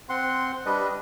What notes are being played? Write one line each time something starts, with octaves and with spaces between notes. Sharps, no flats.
C4 F#5 C6
G3 D4 B4 D#5